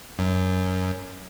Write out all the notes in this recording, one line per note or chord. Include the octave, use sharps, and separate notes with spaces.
F#2